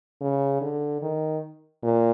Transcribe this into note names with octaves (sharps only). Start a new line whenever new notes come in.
C#3
D3
D#3
A#2